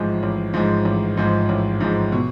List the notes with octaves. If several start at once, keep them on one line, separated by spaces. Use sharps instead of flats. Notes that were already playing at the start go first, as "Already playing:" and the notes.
Already playing: A1 G#2 F3 G#3
A1
G#2 F3 G#3
A1
G#2 F3 G#3
A1
G#2 F3 G#3
B2